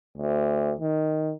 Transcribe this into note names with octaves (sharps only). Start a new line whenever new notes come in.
D2
D#3